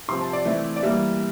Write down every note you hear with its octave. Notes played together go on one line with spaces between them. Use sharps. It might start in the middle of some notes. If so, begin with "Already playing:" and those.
C3 F3 C4 C6
A5
D5
E3 A3 C4 E4
D5
E3 G3 A#3 E5